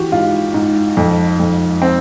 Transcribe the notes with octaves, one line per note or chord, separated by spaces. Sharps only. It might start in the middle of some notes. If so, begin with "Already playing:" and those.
Already playing: E3 F#4 G4
G#2 F4
G#2
F2
F2
C4